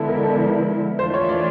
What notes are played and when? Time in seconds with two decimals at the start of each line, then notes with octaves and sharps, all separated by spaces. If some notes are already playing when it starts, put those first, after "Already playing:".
Already playing: D3 F3 G#3 B3 E4 A4
0.08 A#4
0.23 A4
0.39 A#4
0.99 E3 A3 D4 F4 C5
1.14 C#5
1.29 D5